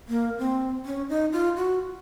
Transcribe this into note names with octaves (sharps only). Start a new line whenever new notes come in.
A#3
C4
C#4
D#4
F4
F#4